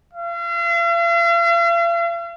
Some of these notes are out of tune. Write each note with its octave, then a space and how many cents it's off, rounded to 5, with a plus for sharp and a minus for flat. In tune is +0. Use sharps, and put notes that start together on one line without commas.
F5 -45